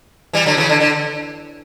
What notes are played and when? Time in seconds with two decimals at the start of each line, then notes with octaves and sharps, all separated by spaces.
0.33 E3 G3
0.46 D3 F#3
0.57 C#3 E3
0.69 D3
0.80 D3